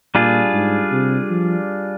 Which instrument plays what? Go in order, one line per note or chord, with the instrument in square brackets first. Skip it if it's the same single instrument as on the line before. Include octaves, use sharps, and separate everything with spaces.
[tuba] A#2 [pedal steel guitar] G3 D4 F4 G#4
[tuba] G#2
C3
F3